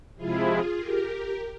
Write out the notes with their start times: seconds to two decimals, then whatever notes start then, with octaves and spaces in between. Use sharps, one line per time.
0.17 C3 F3 G#3 E4 F4 G#4
0.77 G4 A#4